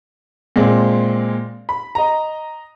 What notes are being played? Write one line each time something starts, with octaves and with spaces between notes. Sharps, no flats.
A#2 G#3 C4
B5
D#5 A#5